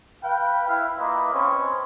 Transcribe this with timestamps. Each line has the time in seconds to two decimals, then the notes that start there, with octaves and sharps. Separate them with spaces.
0.23 B4 F5 G5
0.67 E4 F5
0.98 A#3 E4 F4 B4 D#5 D6
1.32 C4 C#4 B4 C#5 D#5 G#5